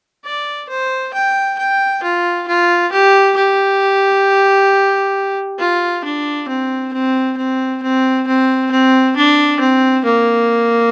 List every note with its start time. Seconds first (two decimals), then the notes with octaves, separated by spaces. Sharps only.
0.25 D5
0.69 C5
1.14 G5
1.59 G5
2.03 F4
2.48 F4
2.92 G4
3.36 G4
5.59 F4
6.05 D4
6.48 C4
6.93 C4
7.37 C4
7.83 C4
8.27 C4
8.71 C4
9.16 D4
9.60 C4
10.05 A#3